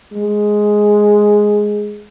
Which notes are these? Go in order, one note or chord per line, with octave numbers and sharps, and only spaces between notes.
G#3